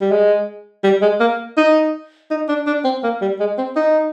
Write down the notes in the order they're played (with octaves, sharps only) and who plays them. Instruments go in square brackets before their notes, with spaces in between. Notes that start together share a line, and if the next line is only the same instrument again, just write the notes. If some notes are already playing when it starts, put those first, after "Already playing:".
[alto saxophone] G3
G#3
G3
G#3
A#3
D#4
D#4
D4
D4
C4
A#3
G3
G#3
C4
D#4